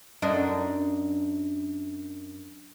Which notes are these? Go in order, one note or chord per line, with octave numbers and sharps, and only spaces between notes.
F#2 D4 D#4